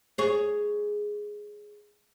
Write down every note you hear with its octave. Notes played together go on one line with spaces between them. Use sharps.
G#4 C#5